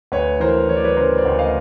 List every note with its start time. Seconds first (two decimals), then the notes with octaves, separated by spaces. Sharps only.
0.12 D2 B4 C#5
0.40 E3 A#4 C5
0.69 E3 C#5
0.76 D5
0.84 B4 C#5
0.97 C#3 A#4 C5
1.18 C5 D5
1.25 D2
1.38 D#5 F5